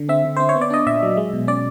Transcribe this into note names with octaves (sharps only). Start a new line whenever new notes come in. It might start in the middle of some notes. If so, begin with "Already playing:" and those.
Already playing: D3
C4 E5
D3
C4 C5
C#5
B3
D5
D4 D#5
A#2 E5
F#3
G#3
B2
C#4 D5